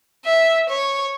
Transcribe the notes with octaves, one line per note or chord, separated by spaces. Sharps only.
E5
C#5